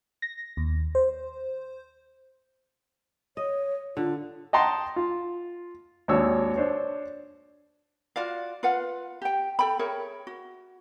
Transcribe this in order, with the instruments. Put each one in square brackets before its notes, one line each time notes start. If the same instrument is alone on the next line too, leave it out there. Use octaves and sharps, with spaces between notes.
[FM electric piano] A#6
D#2
C5
[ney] C#5 [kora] D#5
[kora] D3 [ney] F4
[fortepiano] D#5 F#5 G5 A5 A#5 C6
F4
G#1 D#2 D4 C#5 E6
D4 C5 C#5
[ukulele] F4 F#4 D5 F5
F4 B4 F5 F#5
G4 G5
A4 G5 B5
G#4 A#4 C#5 E5
F#4